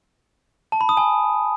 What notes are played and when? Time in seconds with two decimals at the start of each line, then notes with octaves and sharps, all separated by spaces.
0.72 A5
0.81 B5
0.89 D#6
0.97 G#5